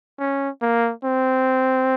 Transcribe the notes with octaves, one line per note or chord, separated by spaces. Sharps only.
C#4
A#3
C4